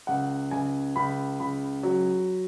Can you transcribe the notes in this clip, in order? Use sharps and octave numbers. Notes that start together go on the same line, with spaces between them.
C#2 F#5
C#2 G#5
C#2 B5
C#2 B5
F#3